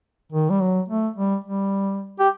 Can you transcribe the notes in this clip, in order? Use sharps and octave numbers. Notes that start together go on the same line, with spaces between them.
D#3
G3
F#3
A3
G3
G3
G4